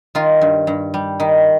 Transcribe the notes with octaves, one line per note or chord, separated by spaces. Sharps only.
D#3 F4
G2
G2
G3
D#3